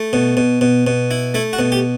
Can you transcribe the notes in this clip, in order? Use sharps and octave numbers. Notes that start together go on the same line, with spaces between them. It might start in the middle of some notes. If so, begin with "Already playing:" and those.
Already playing: A3
B2
B2
B2
B2
E4
A3 E4
F#4
B2
G4